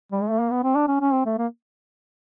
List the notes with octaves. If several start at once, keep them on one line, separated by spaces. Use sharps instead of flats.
G3
G#3
A3
A#3
B3
C4
D4
C#4
C#4
C4
A3
A#3